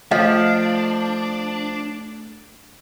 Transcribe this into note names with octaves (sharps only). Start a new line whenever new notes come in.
F3 A3 D4 D#5 F5